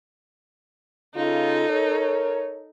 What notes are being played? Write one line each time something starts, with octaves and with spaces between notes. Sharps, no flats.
C#3 D#4 F4 A4
A#4 C#5